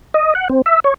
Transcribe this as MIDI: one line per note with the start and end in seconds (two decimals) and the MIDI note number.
0.14 0.34 75
0.35 0.48 78
0.49 0.62 60
0.66 0.80 76
0.84 0.94 73